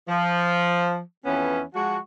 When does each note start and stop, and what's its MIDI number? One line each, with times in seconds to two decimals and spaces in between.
0.08 1.00 53
1.25 1.61 41
1.25 1.61 52
1.25 1.61 59
1.25 1.61 61
1.74 1.97 53
1.74 1.97 56
1.74 1.97 66